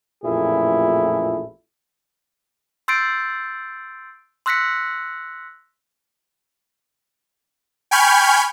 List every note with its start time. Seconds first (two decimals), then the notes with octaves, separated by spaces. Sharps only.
0.24 A1 F2 A#2 A3 E4 G#4
2.88 C6 E6 G6 A6 C7 D7
4.46 C6 E6 F#6 A#6 B6 C#7
7.91 G5 G#5 B5 C#6 F6 G6